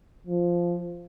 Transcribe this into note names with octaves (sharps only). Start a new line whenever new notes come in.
F3